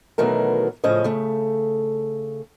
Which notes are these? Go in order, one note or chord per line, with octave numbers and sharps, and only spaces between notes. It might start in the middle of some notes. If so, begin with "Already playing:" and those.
B2 D#3 E3 F#3 A3 A#4
A2 C#3 F3 C#4 D#5
C#3 A3